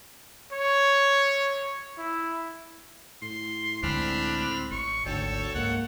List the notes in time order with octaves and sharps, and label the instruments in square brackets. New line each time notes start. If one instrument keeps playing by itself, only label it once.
[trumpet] C#5
E4
[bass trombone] A2 [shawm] C6
[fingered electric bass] C#2 D3 G#3 [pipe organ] C4 B5 F6 [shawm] D4
[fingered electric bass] A1 [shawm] C#6
[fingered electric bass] G#1 [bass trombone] D2 [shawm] A4 [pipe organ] C#5 G5
[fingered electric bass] C#2 G#2 [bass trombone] A#3 [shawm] F#5